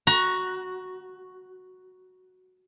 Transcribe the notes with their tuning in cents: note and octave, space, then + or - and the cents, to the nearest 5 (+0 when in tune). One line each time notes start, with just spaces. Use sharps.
F#4 +0 A#5 +25